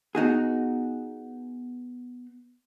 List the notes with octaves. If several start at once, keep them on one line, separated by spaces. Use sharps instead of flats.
B3 D#4 F#4 G#4